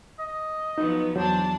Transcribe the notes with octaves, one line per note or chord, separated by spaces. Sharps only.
D#5
F3 F#3 B3 D#4
E2 F#3 D4 C5 A5